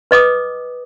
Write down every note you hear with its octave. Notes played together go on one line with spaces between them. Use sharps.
B4 D#5 D6 D#6